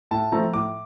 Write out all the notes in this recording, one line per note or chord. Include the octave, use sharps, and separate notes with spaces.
A2 A5
F3 A3 C4 A#5
A2 D6